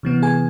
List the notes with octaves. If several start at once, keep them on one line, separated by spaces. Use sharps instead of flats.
C3 E3 B3
G#4 G#5